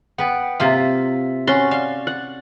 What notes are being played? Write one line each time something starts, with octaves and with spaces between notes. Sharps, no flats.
B3 B4 F#5 G5
C3 A#3 F4 E5
C#4 F#4 C6 A6
D5 F5
F#5